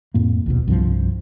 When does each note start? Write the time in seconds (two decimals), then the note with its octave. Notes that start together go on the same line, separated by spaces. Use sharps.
0.14 F2 A2 A#3
0.46 A#1 D#2 B2
0.68 C2 G2 E3 F3